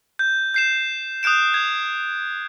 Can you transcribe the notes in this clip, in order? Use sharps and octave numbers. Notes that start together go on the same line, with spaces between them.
G6
G6 C7 E7
D#6 F#6 G6 D7 E7
G#6